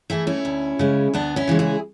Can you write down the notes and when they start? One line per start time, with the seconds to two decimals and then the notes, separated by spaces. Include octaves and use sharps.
0.10 E3 A3 E4 G#4
0.27 C#4 E4
0.45 D2
0.79 C#3 G#3
1.14 D2 B3 D4
1.36 C#4 E4
1.47 C#3 E3 G#3
1.59 E4 G#4